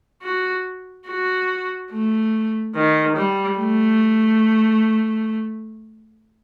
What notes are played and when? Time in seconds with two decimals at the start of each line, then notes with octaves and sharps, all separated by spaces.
0.22 F#4
1.07 F#4
1.91 A3
2.75 D#3
3.17 G3
3.59 A3